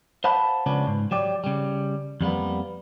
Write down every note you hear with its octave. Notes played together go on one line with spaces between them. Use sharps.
C5 F5 F#5 A5 B5
C#2 C#3 F3 B3 C#4 D4
G#2
F#3 G4 D5
C#3 G3
F2 G3 A#3 B3